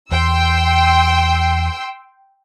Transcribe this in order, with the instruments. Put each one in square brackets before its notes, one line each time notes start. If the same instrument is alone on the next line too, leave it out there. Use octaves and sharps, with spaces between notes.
[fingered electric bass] E2 [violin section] G5 C6 E6